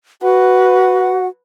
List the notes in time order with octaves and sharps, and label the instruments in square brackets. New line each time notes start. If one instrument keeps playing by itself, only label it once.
[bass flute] F#4 [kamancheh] B4 [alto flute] F#5